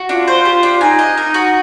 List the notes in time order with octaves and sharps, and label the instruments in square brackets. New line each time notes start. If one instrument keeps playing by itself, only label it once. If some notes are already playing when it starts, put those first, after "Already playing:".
Already playing: [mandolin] F#4
[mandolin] D4 [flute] F4
[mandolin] C5
G4
D4
[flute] D#4 [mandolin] G#5
[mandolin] D#5
A#4
F#4